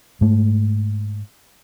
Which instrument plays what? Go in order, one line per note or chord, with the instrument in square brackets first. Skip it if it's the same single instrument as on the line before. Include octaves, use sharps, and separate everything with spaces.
[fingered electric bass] G#2 A3